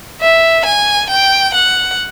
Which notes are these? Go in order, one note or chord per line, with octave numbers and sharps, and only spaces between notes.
E5
G#5
G5
F#5